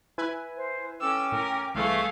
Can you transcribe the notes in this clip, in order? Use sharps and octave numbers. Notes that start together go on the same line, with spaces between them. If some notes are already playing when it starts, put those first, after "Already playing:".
E4 B4 G#5
C5
C#4 A4 G5 D6 E6
A2 A#4
C2 E3 A3 G#4 F5 C#6 G#6